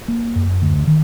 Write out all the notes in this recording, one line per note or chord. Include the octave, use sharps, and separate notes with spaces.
A#3
F#2
D2
D#3